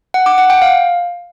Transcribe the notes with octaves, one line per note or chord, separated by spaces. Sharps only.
F#5
D6
F#5
G5
F5